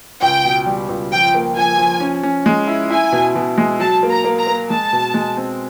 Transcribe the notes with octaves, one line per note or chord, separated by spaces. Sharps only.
C#2 G5
B2
G3
C#2
F3 G5
A#3
F3 G#5
F3
C#4
C#4
G#3
E4
E4 G#5
B2
B2
G#3
F#3 A5
A#3
A#5
A#3
A#5
A#3
G#3 A5
B2
G#3
C4